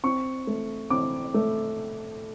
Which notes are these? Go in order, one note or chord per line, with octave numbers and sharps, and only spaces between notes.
C4 C#6
A3
C4 D6
A3